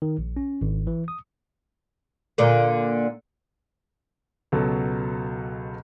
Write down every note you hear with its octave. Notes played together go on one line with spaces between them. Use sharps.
D#3
A#1
C#4
G#1
E3
D#6
A#2 D3 A#3
C#2 B2 F#3 A4